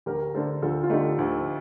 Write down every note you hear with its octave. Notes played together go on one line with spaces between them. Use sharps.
D2 G4 A#4
D3 A3 A4 C5
D2 F4 A4
F4
D3 A3 D#4 G4
D2